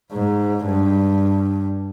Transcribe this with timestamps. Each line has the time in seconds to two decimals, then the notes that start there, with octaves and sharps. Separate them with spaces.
0.12 G#2
0.66 G2